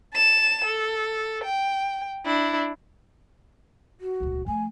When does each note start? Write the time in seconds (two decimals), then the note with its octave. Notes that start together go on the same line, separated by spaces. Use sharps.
0.14 A5 E7
0.65 A4
1.44 G5
2.26 D4 E4
4.00 F#4
4.20 D#1 C#2
4.46 F3 A3 G#5